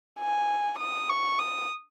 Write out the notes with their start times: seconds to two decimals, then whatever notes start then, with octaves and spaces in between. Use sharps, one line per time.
0.19 G#5
0.79 D#6
1.09 C#6
1.39 D#6